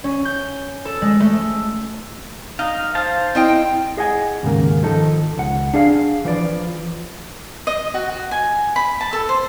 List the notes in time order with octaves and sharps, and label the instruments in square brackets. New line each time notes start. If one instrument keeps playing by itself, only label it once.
[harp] C#4
G6
A4
G#3
A3
[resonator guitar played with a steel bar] D#4 [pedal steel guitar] F5
[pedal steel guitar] C5 F5 A5
[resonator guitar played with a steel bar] C4 D#5 G5 [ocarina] E4
[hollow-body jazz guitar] G#4 D#5 F#5 G#5
D#2 G#2 C#3 A#3
D#3 F3 D#4 A4
C#2 F#5
D4 G#4 F5
E3 F3 B4 D5
[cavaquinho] D#5
F#4
F#4
G#5
B5
A5
A4
C5